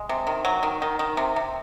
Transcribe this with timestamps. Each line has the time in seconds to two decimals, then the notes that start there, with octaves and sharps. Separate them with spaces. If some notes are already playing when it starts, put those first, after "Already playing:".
Already playing: G#3
0.09 C3
0.27 D#3
0.45 F#3
0.63 D#3
0.82 D#3
0.99 D#3
1.17 C3
1.36 C3